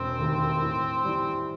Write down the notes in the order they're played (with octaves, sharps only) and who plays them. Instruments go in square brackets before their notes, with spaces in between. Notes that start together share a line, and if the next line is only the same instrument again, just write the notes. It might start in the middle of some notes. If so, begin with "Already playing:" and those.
Already playing: [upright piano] E1 [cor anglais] C4
[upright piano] D#2 D#3 A3
A2
E3 G3